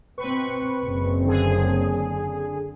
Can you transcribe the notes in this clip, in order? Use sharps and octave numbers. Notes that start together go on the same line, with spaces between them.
B2 C4 B4 C#6
F#1 C4
D3 G#4